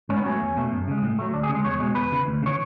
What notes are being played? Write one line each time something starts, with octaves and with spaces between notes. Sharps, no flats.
G#2 C#4
B3
F#3 A3 C#4
E2
B2 A3
F#2
C#3 G#3
A2
F#3 A3
D2 D4
G#4
C#3 G#3
E2 C#5
B2 G#3
E2 B4
C#3 E3
D2
C#3
E3 C#5